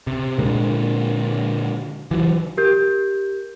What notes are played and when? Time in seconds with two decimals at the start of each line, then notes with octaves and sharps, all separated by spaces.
0.07 C3
0.39 A#2 D3 G#3 A#3
2.11 E3 F#3
2.57 G4 A#4 G6